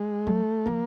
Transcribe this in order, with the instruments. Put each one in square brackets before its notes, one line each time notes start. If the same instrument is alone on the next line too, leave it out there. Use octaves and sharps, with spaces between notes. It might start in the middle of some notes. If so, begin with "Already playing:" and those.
Already playing: [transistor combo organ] G#3
[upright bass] F#3 [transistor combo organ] A3
[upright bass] F3 [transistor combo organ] A#3